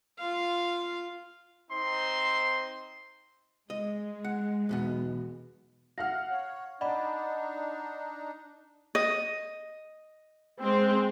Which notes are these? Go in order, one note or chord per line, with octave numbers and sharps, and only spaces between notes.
F4 F5
C4 D#4 C5 C6
G#3 D#5
F#5
B1 E2 B2 B3
F5 F#5 F6 A#6
C#5
D4 D#4 D5 D#5 F#5 B5
D#5
G#3 C4